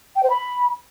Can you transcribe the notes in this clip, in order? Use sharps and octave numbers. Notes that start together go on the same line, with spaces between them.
G5
C5
B5